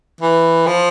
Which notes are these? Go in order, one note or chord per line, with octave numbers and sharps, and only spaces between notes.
E3
F3